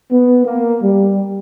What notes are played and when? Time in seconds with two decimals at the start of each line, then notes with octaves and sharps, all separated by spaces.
0.11 B3
0.45 A#3
0.82 G3